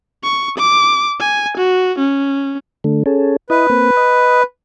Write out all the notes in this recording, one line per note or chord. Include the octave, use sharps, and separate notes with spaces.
C#6
D6
G#5
F#4
C#4
D3 A3
C#4 G#4 A4
E4 B4 D#5
A#3 C4
D#5